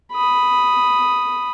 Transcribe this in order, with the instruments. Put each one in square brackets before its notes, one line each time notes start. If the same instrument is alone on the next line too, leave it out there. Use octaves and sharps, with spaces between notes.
[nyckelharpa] B5 D#6